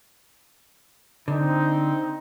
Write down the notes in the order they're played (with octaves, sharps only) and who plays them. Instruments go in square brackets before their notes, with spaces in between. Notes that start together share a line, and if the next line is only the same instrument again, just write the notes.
[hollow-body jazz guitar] D3 [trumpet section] C4 D#4